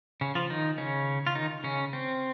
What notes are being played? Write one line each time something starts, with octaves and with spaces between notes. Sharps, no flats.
C#3 C#4
F3 F4
D#3 D#4
C#3 C#4
F4
D#3 D#4
C#3 C#4
C4